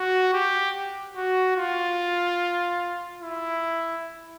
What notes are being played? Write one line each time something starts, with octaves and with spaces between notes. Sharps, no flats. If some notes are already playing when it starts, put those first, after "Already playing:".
Already playing: F#4
G4
F#4
F4
E4